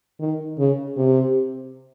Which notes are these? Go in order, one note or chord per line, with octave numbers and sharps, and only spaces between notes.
D#3
C#3
C3